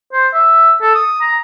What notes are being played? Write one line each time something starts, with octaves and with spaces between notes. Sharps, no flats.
C5
E5
A4
D#6
A#5